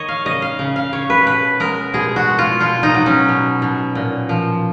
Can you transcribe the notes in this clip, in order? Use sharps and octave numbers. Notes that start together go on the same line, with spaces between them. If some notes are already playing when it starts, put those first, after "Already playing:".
Already playing: D#3 A#3 C#5 D#5
F5
C#3 D#5
F5
C#3
F5
C#3 C#5
B4
B2 B4
G#3 A#4
B2 G#4
F#4
G#3
F4
B2 F4
D#4
F#3
C#4
B2
B2
A#2
F3